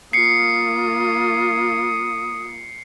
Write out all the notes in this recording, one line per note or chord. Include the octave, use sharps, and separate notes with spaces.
A#3 F4 D#6 C7 C#7